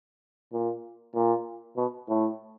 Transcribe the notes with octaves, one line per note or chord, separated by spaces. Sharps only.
A#2
A#2
B2
A2